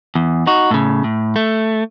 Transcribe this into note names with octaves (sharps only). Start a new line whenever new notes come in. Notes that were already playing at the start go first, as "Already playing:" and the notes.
E2
D#4 F#4
A2 C#3
A2
A3